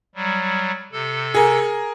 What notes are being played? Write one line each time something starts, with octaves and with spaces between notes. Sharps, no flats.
F#3 G3
C3 A4
G#4 A#4